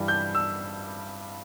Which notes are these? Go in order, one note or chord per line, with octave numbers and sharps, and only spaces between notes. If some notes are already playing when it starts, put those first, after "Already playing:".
Already playing: G2 E3 G3
G6
E6